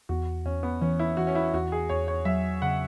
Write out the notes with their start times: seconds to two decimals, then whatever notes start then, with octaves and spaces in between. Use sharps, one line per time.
0.09 E2 F#4
0.45 E2 C#4
0.63 B3
0.81 E3 C#4
0.99 E4
1.17 E3 F#4
1.27 C#4
1.35 E4
1.54 E2 F#4
1.72 G#4
1.89 E2 C#5
2.08 C#5
2.25 F#3 E5
2.62 C#3 F#5